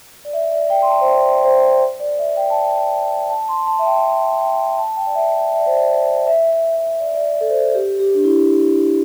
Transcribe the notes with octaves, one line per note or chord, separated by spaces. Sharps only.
D5
E5
D5
G5
C6
A5
C5
D5
D5
C5
D5
E5
G5
A5
G5
A5
C6
A5
E5
G5
A5
G5
A5
G5
D5
E5
E5
E5
D5
C5
D5
E5
E5
E5
D5
D5
E5
A4
C5
G4
G4
D4
E4